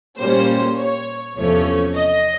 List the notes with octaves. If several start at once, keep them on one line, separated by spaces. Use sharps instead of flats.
A#2 G3 A#3 C#4 C5
C#5
E2 C3 F3 A3 C#4 C#5
D#5